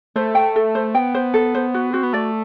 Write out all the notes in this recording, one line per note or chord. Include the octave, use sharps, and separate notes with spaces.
A3 C5
G5
A4
C5
B3 G5
C5
A4
C5
F#4
C4 F#4
B3
A3 D5